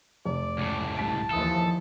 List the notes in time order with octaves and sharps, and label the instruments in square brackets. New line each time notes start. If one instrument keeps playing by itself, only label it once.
[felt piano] F1 [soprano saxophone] D5
[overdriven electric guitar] C#2 A2
[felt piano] C2 B6 D7 [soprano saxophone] A5
[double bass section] D#2 E3 F3 [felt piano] E4 D#6 [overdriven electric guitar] A4